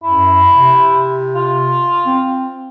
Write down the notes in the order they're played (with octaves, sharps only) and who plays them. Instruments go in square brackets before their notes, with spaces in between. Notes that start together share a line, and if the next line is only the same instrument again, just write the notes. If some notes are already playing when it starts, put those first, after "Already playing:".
[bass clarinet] F#2 [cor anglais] E4
[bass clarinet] C3
[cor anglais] F4
[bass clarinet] C4